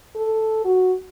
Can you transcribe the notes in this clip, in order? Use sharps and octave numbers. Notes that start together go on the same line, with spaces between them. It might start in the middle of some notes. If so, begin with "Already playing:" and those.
A4
F#4